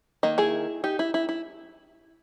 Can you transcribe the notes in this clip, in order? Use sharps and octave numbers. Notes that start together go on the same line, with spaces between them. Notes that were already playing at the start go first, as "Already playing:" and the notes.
D#3 A#3 D#5
E4 G#4
D#4 G4
E4
E4
E4